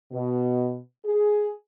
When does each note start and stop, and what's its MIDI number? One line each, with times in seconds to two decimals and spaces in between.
0.12 0.78 47
1.05 1.50 68